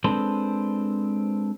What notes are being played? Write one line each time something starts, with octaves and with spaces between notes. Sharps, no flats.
G#3 C4 D4 A4 B4 C5